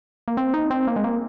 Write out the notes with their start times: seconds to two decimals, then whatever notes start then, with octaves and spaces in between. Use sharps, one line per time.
0.28 A#3
0.37 C4
0.54 D#4
0.70 C4
0.87 A#3
0.96 G#3
1.04 A#3